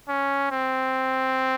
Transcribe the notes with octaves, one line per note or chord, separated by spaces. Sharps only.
C#4
C4